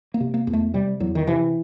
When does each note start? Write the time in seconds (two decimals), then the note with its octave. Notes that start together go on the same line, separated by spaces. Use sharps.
0.14 A#3
0.20 C3
0.34 A#3
0.47 E2
0.53 A3
0.74 C3 G3
1.00 E2 F#3
1.15 D#3
1.27 C3 E3